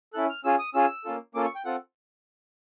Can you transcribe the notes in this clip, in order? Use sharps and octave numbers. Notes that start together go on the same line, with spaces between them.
C#4 E4 A4 F#6
F6
C#4 F4 G#4 E6
D#6
C#4 F4 G#4 E6
A#3 C#4 F4 A4
A#3 C#4 F4 A4 D6
C#6
G5
C4 F4 A4 F#5